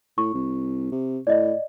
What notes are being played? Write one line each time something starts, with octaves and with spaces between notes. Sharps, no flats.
A2 C#6
C2
C3
A2 D5 D#5